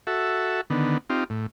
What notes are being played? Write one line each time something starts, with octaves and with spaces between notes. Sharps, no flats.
F#4 A4 E5
D3 D#3 B3
C4 D#4 F4 G4
A2